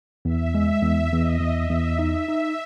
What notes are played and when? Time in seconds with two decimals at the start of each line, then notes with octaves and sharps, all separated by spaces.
0.25 E2 E5
0.54 G#3 E5
0.83 E2 E5
1.12 E2 D#5
1.41 E2
1.55 E5
1.69 E2
1.99 D#4 E5
2.28 D#4